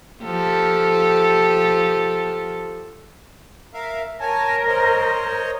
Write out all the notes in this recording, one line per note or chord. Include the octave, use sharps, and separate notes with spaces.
F3 G4 A4
A#4 E5 F5
A#4 C#5 G#5 A5
C5 C#5 D#5